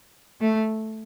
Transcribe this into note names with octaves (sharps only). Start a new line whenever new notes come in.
A3